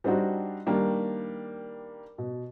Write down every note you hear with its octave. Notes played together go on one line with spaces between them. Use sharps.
G3 C4 D4 D#4 F#4
D#3 G3 A#3 D4
B2